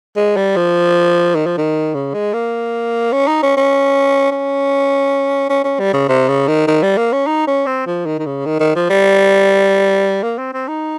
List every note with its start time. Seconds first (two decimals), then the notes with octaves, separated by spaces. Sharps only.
0.16 G#3
0.36 G3
0.56 F3
1.35 D#3
1.46 F3
1.58 D#3
1.94 C#3
2.14 G#3
2.34 A#3
3.13 C#4
3.27 D#4
3.42 C#4
3.57 C#4
4.31 C#4
5.50 C#4
5.64 C#4
5.79 G3
5.93 C#3
6.09 C3
6.28 C#3
6.48 D#3
6.67 D#3
6.83 G3
6.97 A#3
7.13 C#4
7.27 D#4
7.47 C#4
7.66 C4
7.87 F3
8.06 D#3
8.19 D#3
8.26 C#3
8.46 D#3
8.60 D#3
8.75 F3
8.90 G3
10.23 A#3
10.38 C4
10.53 C4
10.68 D#4